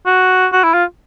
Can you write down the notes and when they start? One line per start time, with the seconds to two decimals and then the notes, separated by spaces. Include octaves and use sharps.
0.06 F#4
0.52 F#4
0.64 E4
0.74 F4